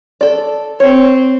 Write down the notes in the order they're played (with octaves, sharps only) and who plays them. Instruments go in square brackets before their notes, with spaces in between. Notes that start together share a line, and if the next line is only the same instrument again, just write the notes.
[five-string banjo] A4 D5
[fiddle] C4 [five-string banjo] C#5